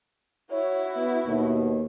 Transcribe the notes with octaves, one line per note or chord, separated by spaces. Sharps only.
E4 F#4 C#5
B3
D#2 B2